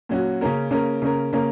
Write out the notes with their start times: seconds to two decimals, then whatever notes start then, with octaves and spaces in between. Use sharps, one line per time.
0.09 A#2 F#3 C#4 F#4
0.41 C#3 A#3 C#4 A#4
0.71 C#3 A#3 C#4 A#4
1.02 C#3 A#3 C#4 A#4
1.33 C#3 A#3 C#4 A#4